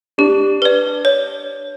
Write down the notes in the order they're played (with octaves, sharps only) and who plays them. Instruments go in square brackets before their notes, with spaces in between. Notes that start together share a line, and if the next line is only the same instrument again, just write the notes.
[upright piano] D4 [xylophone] G4
[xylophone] B4 D5
C#5